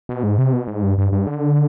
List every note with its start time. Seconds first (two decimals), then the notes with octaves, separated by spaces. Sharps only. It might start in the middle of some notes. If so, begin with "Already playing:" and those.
0.09 B2
0.23 G#2
0.38 C3
0.53 B2
0.67 G#2
0.83 G2
0.98 G2
1.12 G2
1.27 D3